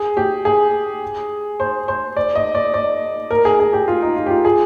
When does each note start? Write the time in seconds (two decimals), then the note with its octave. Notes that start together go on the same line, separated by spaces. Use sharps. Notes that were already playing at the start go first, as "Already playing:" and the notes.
Already playing: G#4
0.17 G4
0.45 G#4
1.60 C5
1.88 C5
2.17 D5
2.35 D#5
2.55 D5
2.74 D5
3.31 A#4
3.45 G#4
3.60 G#4
3.73 G4
3.88 F4
4.02 D#4
4.16 F4
4.26 G4
4.30 F4
4.45 G#4